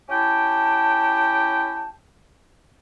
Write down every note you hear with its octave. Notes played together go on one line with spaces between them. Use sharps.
C#4 E4 G4 G5 A5